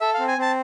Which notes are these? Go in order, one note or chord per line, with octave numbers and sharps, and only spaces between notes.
A4 E5
F5
C4
G#5
C4 A5